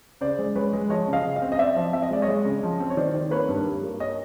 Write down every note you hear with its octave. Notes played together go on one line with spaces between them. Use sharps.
C#3 C5 D5
G#3
G#3 B4 C#5
G#3
F3 C#5 D#5
C#3
D#5 F5
C#3
D#5 F5
C4
D#5
C4 D5 E5
F3
C4 E5
D#5
G#3 D5
C#5 D#5
G#3
C#3
F3
C4
C#5
D#3 C5 D5
D#3
A#3 B4 C#5
G2
G3
A#3
C#5 D#5